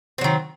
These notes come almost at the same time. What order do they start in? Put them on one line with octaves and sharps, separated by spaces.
C4 F#3 D#3